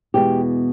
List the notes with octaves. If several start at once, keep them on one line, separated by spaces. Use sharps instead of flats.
E2 B2 G#3 B3 G4